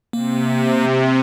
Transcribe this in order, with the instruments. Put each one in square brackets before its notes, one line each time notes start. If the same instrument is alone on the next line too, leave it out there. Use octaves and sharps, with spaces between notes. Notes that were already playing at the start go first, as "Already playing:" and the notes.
[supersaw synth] C3 [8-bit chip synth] A#3